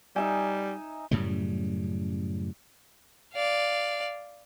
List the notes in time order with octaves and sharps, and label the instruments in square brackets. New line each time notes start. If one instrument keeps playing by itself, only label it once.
[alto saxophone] G3 [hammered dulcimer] D#4 E5 G#5
[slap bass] F#2 A2 C#3 G3
[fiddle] D5 F5